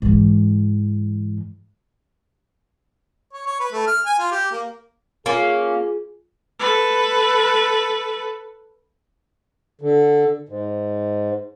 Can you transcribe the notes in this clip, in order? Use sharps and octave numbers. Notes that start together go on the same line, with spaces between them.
G#2 E3
C#5
C#5
B4
A3
F6
G#5
F4
G4
A#3
A#3 C#4 F4 G#4
A4 B4
D3
G#2